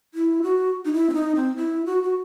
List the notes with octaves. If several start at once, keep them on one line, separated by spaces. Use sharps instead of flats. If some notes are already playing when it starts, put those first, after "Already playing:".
E4
F#4
D#4
E4
C4
D#4
C4
E4
F#4
F#4